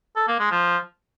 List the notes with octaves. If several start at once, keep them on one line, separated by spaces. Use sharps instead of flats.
A4
A#3
G#3
F3